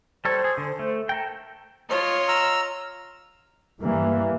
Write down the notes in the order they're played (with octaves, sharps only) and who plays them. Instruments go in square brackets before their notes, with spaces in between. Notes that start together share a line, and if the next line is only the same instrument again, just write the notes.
[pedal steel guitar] G3 A4 C#5 [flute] C5
[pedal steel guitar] G#4
D3
A3
A4 A#4 G5
[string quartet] F4 C#5 D#5
[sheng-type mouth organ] A#5 E6 F6
[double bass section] G2 E3 A#3